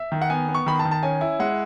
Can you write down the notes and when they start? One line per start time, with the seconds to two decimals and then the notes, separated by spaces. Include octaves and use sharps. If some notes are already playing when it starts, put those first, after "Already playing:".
Already playing: E5
0.12 D#3
0.22 F#5
0.30 B3 G#5
0.48 B3
0.54 C#6
0.66 D#3 B5
0.79 A5
0.85 D#3
0.91 A5
1.03 C#4 G#5
1.21 E4
1.40 G#3 F#5